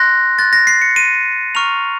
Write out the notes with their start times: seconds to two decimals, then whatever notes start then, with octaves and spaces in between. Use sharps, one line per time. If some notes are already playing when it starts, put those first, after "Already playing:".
Already playing: C6 F#6 A#6
0.38 C6 F#6 A6
0.53 A#6
0.67 C7
0.82 C#7
0.96 C6 F#6 D#7
1.55 A#5 C#6 F6 F7